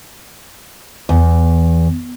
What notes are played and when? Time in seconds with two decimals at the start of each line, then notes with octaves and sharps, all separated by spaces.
1.09 E2